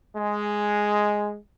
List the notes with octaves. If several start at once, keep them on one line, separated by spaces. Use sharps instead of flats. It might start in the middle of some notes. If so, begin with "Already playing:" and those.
G#3